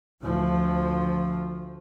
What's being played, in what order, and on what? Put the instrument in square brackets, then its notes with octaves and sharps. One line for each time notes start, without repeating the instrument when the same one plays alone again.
[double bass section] D2 F3